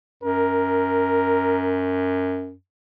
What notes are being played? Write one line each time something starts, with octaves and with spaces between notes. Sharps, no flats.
F#2 A#4